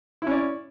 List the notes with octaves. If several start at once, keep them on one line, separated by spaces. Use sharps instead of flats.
C#4 E4 D5